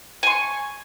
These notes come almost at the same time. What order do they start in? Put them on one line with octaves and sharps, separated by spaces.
G#5 C6 C#6